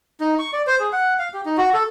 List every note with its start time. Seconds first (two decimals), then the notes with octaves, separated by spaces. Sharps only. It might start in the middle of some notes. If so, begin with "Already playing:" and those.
0.20 D#4
0.39 C#6
0.53 D5
0.67 C5
0.80 G#4
0.93 F#5
1.19 F5
1.34 G4
1.46 D#4
1.57 F#4
1.74 A4